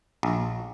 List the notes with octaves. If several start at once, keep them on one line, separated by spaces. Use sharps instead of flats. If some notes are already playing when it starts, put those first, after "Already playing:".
A#1